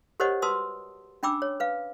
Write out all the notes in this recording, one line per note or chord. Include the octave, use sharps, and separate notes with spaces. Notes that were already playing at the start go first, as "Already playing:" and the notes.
G4 A#4 C5 C#5 D#5 F#5
F#4 B4 A5 C6 D#6 E6
C#4 D4 G5 B5 D6 E6
C#5
B4 F5